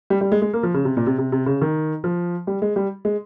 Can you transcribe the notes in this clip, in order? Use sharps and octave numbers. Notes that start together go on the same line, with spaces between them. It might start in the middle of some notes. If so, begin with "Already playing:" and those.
G3
G3
G#3
G#3
A#3
F3
C#3
C3
A#2
C3
C3
C3
C#3
D#3
F3
G3
G#3
G3
G#3